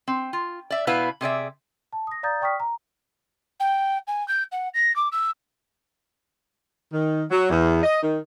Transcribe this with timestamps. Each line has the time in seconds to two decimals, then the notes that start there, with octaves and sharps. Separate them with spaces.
0.08 C4
0.33 F4
0.70 D5 E5
0.87 B2 B3 E4 B4 F5
1.21 C3 G#4 D5 E5
1.93 A5
2.07 D#6 A#6
2.23 D5 F5 A#5 D#6 G6 A6
2.41 D5 G5 C#6 D#6 F6 B6
2.60 A#5
3.60 G5
4.07 G#5
4.28 G6
4.52 F#5
4.74 A#6
4.96 D6
5.12 E6
6.92 D#3
7.30 F#3
7.50 E2
7.83 D#5
8.03 D#3